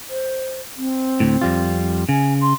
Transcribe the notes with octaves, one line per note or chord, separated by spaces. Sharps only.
C5
C4
D2 A2
F2 G3 F4
C#3 G#5
C6